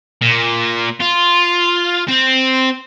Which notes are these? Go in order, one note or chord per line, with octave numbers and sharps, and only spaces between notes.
A#2
F4
C4